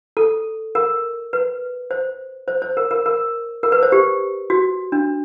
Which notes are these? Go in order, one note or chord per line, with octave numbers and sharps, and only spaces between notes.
A4
A#4
B4
C5
C5
C5
A#4
A#4
A#4
A#4
B4
C5
G4
F#4
D4